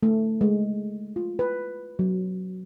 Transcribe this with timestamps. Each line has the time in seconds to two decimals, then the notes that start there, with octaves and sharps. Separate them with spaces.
0.03 A3
0.41 G#3
1.16 F4
1.39 B4
1.99 F#3